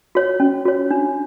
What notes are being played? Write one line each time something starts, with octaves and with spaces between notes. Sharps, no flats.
F#4 C#5
C#4
F#4 C#5
D4